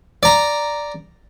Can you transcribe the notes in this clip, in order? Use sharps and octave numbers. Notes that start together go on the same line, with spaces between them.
D5 A#5